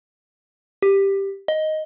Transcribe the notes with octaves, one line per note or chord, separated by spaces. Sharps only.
G4
D#5